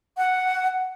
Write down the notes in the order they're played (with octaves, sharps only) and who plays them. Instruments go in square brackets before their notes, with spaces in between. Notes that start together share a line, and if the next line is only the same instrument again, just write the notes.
[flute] F#5